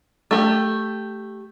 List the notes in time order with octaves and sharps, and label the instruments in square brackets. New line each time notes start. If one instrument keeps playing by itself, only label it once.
[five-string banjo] A3 G4